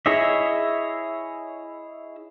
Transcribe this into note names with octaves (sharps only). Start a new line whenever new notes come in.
E4 G#4 C#5 D#5 E5